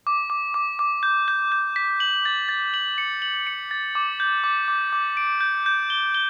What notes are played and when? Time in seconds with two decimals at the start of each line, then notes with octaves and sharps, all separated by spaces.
0.07 D6
0.30 D6
0.54 D6
0.79 D6
1.03 G6
1.28 G6
1.52 G6
1.76 B6
2.00 F#7
2.25 A6
2.49 A6
2.74 F#7
2.98 C#7
3.22 F#7
3.47 C#7
3.71 A6
3.95 D6
4.20 G6
4.44 D6
4.68 D6
4.93 D6
5.17 D7
5.41 G6
5.66 G6
5.90 G7
6.14 G7